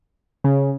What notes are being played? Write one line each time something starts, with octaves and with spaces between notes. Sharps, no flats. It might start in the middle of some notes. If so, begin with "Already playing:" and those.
C#3